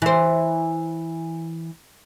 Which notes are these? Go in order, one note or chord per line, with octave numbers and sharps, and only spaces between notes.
E3 C5